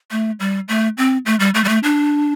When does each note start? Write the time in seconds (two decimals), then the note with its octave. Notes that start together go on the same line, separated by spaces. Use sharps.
0.11 A3
0.40 G3
0.69 A3
0.98 C4
1.26 A3
1.40 G3
1.55 A3
1.64 G3
1.69 A3
1.83 D4